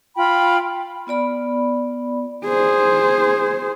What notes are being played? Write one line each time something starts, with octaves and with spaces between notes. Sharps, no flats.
F4 G5 B5
B3 F4 D5 B5
G#4 C5